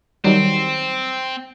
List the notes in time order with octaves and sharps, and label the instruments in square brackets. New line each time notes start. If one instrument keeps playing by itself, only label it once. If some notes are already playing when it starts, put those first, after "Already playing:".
[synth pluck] D#3 F#3 G3 [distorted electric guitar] C4